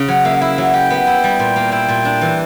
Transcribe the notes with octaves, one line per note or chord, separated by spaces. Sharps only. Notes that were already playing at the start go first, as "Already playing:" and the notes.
Already playing: C#3
F#3 F#5
A#3 E5
F#5
E4 E5
F#3
G4 G5
B3
E4
G3
A#2
A#3
E4 G5
A#2
D4
E3